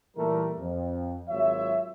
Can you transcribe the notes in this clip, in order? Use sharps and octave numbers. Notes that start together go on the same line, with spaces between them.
A#2 E3 G3 A3 A4 A#4
F2
G#1 F#3 F4 C#5 E5